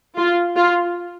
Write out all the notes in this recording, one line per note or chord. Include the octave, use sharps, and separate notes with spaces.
F4
F4